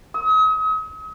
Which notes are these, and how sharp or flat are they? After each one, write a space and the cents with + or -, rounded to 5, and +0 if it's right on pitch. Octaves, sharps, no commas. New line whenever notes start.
D#6 +40